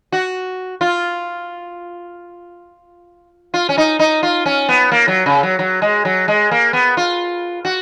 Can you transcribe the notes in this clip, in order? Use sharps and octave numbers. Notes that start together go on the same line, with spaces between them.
F#4
F4
F4
C#4
D#4
D#4
F4
C#4
B3
A#3
F#3
C#3
F#3
F#3
G#3
F#3
G#3
A#3
B3
F4
F#4